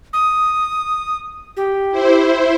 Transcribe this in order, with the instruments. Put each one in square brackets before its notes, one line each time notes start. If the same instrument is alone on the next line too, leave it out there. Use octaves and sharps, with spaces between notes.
[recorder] D#6
G4
[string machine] E4 C5